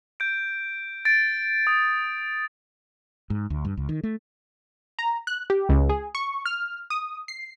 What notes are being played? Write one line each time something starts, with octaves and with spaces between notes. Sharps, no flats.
G6 D7
A6 D7
D#6
G#2
D2
G2
C#2
D#3
A3
A#5
F#6
G4
C#2
G#4
C#6
F6
D#6
C7